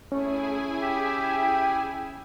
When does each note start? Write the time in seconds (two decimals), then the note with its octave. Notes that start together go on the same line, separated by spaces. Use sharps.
0.12 A3 C#4 E4 G#4 G#5
0.81 G4 E5 G5